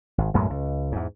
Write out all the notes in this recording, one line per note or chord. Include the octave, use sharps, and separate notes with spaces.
G#1
B1 F#2 A2 G#3
C#2
E2 G#2